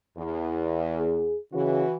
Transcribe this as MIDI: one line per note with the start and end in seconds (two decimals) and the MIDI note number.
0.18 1.34 40
0.98 1.38 68
1.53 1.84 49
1.53 1.97 52
1.53 1.97 66